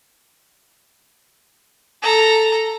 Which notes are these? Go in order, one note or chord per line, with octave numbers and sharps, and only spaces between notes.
A4 A#5